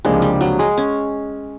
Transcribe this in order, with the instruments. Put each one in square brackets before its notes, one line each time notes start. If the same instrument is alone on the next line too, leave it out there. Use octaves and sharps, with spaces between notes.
[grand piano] C#2 C3 F3 A#3 D4 [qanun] G#3
[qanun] G3
F#3
G#3
C#4